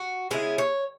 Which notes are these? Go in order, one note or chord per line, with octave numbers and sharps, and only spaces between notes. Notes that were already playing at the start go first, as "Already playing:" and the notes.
Already playing: F#4
C#3 G#3 B3 E4 G#4
C#5